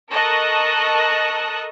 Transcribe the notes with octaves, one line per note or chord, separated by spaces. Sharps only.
A4 A#4 D#5 A5 C#6 F#6